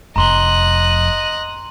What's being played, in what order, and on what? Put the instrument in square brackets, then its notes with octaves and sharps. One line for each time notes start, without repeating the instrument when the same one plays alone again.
[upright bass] F1 F2 [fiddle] D#5 F#6 [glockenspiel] A#5 C6 G7